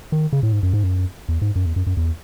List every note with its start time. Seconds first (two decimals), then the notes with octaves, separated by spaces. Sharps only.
0.12 D#3
0.33 C#3
0.43 A2
0.53 G#2
0.63 F#2
0.73 G#2
0.83 F#2
1.29 E2
1.42 G#2
1.56 F#2
1.66 E2
1.76 F#2
1.87 F#2
1.97 E2